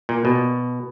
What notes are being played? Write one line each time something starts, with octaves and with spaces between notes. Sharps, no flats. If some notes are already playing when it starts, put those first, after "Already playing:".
A#2
B2